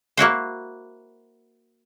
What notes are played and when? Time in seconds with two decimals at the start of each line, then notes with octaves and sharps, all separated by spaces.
0.17 A#3 E4 F#4 C5